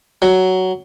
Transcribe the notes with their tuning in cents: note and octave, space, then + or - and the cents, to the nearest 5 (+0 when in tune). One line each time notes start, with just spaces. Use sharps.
F#3 +10